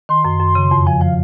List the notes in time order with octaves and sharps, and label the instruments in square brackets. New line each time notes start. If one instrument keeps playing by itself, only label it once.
[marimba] D#3 [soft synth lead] C6
[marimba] F#2
F#2
C#3
F2
[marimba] F3 [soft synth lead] G#5
[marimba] F3 [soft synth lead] F5